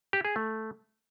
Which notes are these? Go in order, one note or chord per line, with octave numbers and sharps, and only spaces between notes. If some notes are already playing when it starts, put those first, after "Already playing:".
G4
G#4
A3